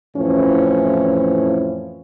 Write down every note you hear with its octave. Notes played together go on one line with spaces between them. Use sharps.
F2 A2 E3 F3 C#4